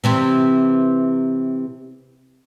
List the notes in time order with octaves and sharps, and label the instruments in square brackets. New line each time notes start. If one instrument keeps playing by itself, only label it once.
[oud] C3 E3 C4